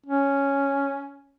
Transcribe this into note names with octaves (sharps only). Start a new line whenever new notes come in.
C#4